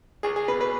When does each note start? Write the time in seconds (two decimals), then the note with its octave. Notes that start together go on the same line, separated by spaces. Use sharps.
0.23 C#2 G#4
0.36 G#4
0.48 B2 B4
0.61 B4